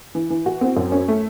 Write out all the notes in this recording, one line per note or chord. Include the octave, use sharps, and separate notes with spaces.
E3
E3
F#4
C4
F#2
C#4
A3